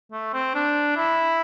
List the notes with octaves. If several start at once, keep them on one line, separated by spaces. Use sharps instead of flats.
A3
C4
D4
E4